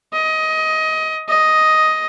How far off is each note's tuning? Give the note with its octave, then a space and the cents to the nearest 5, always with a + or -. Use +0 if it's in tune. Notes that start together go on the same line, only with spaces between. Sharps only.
D#5 +20
D#5 +5